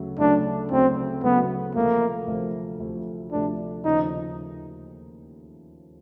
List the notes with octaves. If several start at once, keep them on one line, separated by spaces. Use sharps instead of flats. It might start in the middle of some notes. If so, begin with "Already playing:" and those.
Already playing: D2 C#3 F#3 A3
D2 C#3 F#3 A3 D4
D2 C#3 F#3 A3 C4
D2 C#3 F#3 A3 B3
D2 C3 F3 A3 A#3
D2 C3 F3 A3
D2 C3 F3 A3
D2 C3 F3 A3 D4
D#2 C#3 F3 D#4